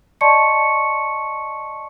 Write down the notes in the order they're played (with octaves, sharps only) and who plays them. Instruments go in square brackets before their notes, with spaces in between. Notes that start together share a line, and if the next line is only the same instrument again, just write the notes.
[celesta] D5 D#5 A5 C6 C#6 C#7